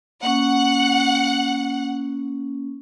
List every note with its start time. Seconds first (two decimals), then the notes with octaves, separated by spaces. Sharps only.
0.23 A#3 C#4 F#5